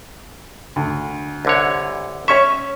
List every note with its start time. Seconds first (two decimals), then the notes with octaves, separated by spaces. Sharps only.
0.76 D2
1.45 C2 D3 C#5
2.28 C#4 C#5 E5 C#6